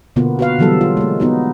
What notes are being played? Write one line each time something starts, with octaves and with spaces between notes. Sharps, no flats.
B2 D3 A#3 B3 F4
F#4 B4 F5
D3 E3 F#3 G3 B3 A4
F4
G#3 A#3
B3 D#4 F#4